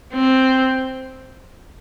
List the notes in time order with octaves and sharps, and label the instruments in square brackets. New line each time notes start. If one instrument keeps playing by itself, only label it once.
[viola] C4